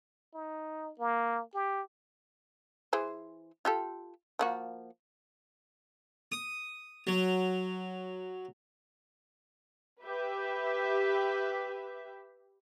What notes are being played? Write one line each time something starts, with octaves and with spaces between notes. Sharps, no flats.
D#4
A#3
G4
E3 G#4 C5
F4 G4 A4
F3 A#3 F#4
D#6
F#3
G4 B4 E5